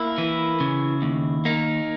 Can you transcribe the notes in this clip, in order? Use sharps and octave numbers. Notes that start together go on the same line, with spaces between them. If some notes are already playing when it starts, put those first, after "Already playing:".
Already playing: A#3 E4
E3
C#3
D#2
A#3 D#4